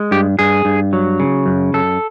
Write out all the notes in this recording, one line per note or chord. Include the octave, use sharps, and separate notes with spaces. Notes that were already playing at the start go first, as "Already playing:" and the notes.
Already playing: G#3
G2 G4
G2 G#4
G2
F#3
C#3
F#2
F#2 A4